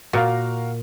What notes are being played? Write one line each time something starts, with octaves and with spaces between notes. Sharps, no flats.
A#2 F#4 A#4 F5